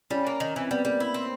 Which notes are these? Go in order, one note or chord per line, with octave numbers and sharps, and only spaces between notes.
G3 C#4
A#3
D#3
E3 C4
G3 B3
G3 A#3
E4
C4